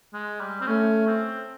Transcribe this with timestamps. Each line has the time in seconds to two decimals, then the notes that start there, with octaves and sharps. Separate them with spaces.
0.14 G#3
0.40 G3
0.61 C4
0.67 A3 C#4
1.07 C4